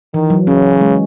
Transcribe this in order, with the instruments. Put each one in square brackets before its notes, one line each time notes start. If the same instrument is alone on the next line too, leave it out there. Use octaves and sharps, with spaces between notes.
[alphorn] D#3 [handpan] E3
[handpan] F#3
[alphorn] C#3 [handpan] C#4
[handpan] G#3